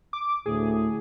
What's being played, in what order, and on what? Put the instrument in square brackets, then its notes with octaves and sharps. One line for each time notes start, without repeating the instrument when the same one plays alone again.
[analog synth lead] D6
[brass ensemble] D2 A2 [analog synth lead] G#4